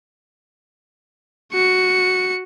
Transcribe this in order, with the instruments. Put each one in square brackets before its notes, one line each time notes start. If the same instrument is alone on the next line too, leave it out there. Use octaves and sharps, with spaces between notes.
[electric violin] F#4 C#7